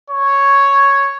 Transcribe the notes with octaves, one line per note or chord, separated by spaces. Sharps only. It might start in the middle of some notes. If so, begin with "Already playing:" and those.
C#5